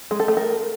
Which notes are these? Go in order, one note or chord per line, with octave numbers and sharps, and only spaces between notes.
G#3
A4
A3
A#4